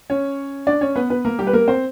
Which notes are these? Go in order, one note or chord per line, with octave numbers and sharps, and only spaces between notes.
C#4 C#5
D4 D5
C#4 C#5
B3 B4
B3 B4
A#3 A#4
G3 G4
B4
A#3 A#4
C4 C5